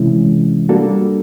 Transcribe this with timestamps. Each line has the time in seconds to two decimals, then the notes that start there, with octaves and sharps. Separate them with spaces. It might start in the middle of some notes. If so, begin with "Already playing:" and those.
Already playing: C3 E3 G#3 C#4 E4
0.69 G3 A#3 D4 F#4 A4